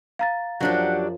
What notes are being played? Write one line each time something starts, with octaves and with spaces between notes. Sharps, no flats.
F5 A#5 A6
F#2 F3 F#3 D4 G4 F#5